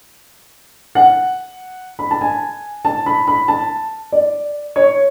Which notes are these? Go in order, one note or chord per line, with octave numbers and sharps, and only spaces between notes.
F#5
B5
A5
G#5
A5
B5
B5
A5
D5
C#5